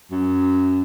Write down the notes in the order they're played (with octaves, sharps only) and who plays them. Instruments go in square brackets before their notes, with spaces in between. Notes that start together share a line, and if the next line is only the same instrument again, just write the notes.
[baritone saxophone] F#2